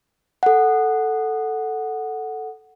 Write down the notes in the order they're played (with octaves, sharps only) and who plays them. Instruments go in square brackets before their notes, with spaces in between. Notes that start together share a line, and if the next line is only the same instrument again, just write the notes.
[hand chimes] A4 F#5